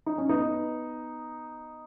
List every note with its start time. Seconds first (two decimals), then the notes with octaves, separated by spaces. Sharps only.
0.06 D#4
0.18 C#4
0.29 B3 D#4